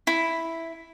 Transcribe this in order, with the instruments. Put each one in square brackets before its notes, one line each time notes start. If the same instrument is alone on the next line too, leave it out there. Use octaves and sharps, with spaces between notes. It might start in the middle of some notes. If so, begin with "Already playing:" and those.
[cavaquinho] E4